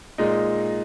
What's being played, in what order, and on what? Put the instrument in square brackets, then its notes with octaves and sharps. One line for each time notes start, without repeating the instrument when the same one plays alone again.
[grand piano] A#2 G#3 D#4